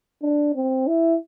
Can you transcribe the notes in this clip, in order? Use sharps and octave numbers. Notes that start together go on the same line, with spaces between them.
D4
C4
E4